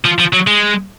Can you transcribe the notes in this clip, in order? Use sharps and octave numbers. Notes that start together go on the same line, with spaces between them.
F3
F3
F#3
G#3